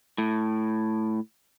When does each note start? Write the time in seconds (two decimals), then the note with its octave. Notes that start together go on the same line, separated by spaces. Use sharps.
0.18 A2